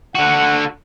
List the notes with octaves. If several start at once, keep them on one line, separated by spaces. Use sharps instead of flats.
D3 F#4 F#5